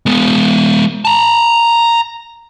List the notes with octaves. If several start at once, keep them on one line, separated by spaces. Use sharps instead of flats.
G#3 B3
A5 A#5